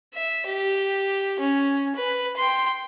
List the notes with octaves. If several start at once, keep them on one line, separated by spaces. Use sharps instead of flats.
E5
G4
C#4
B4
G5 C6